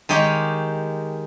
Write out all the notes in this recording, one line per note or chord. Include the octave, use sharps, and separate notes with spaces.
D#3 G#3 D#4 G4 C#5